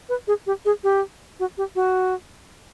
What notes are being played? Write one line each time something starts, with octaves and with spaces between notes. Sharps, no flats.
B4
G#4
G4
G#4
G4
F#4
G4
F#4